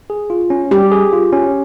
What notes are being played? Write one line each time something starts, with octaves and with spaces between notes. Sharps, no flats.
G#4
F4
C#4
G3 G4
G#4
F4
C#4